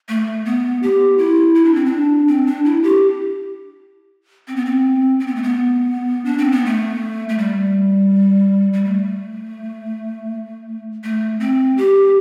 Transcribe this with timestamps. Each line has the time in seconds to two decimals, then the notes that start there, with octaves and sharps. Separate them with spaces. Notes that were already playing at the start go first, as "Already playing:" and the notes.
0.09 A3
0.45 B3
0.83 G4
1.18 E4
1.55 E4
1.65 D4
1.75 C4
1.86 D4
2.28 C4
2.46 D4
2.65 E4
2.83 G4
4.48 C4
4.56 B3
4.65 C4
5.20 C4
5.27 B3
5.36 A3
5.43 B3
6.25 D4
6.38 C4
6.52 B3
6.66 A3
7.29 A3
7.38 G3
8.73 G3
8.85 A3
11.04 A3
11.40 C4
11.77 G4